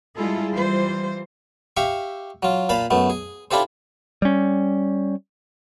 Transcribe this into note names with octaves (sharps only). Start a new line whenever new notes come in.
G3 G#3 E4 F4 G#4 A4
E3 G3 F4 C5
G4 E5 F5 C#6
F#3 F4
A#2 F5 A5 B5
F#2 A3 B3
G#4
D4 E4 F4 G4 A4 C5
G3 C#4